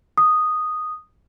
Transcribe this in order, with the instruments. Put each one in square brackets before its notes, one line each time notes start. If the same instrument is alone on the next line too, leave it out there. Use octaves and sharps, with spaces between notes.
[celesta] D#6